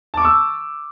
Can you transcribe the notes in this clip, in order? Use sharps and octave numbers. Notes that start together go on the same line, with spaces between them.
A5 C#6 D6 E6